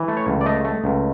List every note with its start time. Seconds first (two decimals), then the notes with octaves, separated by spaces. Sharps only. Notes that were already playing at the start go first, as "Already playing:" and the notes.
Already playing: E3
0.08 A3
0.17 C#5
0.27 C#2
0.41 D5
0.46 A3 D#5
0.65 A3
0.84 C#2